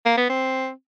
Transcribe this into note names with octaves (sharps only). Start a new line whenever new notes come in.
A#3
B3
C4